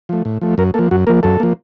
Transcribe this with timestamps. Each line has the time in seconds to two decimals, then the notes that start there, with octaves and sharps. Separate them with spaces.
0.09 F3 A3
0.25 A2
0.41 F3 A3
0.58 F#2 A#4
0.74 F3 A#3 A4
0.91 F#2 F#4
1.07 F3 A#3 A#4
1.23 F#2 A4
1.40 F3 A#3